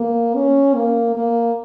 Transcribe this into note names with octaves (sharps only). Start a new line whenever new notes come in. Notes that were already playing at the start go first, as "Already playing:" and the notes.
Already playing: A#3
C#4
A#3
A#3